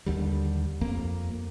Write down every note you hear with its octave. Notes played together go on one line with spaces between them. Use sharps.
D#2 D3 G3
F2 A#3